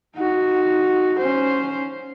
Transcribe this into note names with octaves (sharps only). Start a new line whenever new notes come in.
D#4 F#4
C#4 C5